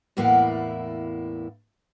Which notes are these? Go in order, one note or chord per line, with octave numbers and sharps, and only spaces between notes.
E2 A2 A#3 E4 F5 F#5